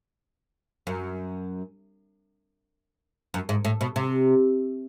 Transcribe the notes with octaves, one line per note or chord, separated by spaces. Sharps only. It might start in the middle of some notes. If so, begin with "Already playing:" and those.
F#2
F#2
G#2
A2
B2
C3